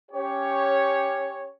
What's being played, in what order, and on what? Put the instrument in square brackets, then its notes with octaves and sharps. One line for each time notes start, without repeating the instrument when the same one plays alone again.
[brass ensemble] C#4 G4 C#5